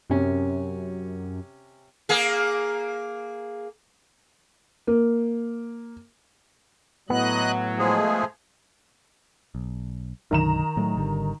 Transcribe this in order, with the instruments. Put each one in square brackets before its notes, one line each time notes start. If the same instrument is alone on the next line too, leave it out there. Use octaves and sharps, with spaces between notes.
[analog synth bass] F#2 [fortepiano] C3 C#4
[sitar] A#3 G#4
[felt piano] A#3
[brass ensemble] A2 F#3 [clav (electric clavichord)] B3 [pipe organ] D#5 F#6
[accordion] F3 G#3 G#4 [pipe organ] A3
[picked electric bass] B1
[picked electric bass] B1 F#2 D3 [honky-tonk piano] D#3 A#5 E7
[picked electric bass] A2 F#3 A3
G#1 D3 G3